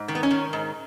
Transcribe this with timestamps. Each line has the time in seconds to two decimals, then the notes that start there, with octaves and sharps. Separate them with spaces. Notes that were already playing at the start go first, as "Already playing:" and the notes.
Already playing: G#2
0.08 D#3
0.15 B3
0.23 C#4
0.31 D#3
0.53 G#2